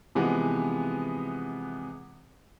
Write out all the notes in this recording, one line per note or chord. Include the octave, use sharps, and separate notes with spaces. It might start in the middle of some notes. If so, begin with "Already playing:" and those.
C3 E3 F3 G#3 B3